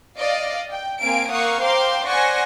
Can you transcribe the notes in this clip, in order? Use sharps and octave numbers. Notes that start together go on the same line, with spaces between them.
D5 D#5 F5
G5
A#3 C4 F5 G#5 D7
A#3 F5 F#5 C#6 D#6
C5 F5 G5 A#5 C6 D6
C5 D5 F#5 G#5 C#6 A#6